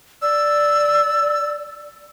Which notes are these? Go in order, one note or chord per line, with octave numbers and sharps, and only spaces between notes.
D5 E6